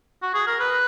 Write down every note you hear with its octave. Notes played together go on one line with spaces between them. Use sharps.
F#4
G#4
A#4
B4